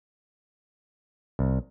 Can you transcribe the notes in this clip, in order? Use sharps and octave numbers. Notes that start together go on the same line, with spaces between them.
C2